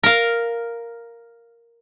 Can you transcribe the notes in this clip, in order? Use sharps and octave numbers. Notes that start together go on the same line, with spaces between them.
A#4 F5